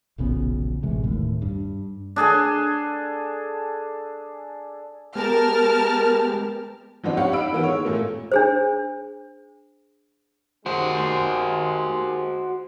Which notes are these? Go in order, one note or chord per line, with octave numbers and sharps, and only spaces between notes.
E1 A#1 C#3 B3
A1 C3 G#3
E1 D#2 A2
G2
D4 G#4 A4 G#5
G#3 B3 G4 A#4 A5 F6
F3 F#3 B3 C4 D4 D#4
G4 C#5 F5 F#5
D#4 B5 E6 D7
D#3 E3 A#3 B3
D#3 G#3 C#5
A#2 A3 A#3
D4 G#4 C5
D#2 G#3 F#4 C5